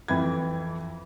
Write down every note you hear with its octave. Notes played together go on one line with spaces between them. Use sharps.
F2 E3 B5 G#6